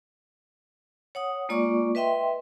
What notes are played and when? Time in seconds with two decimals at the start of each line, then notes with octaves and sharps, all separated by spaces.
1.15 C#5 F#5 D#6
1.49 G#3 A#3 F4 D5 C#6 D6
1.95 B4 D#5 E5 G5 C6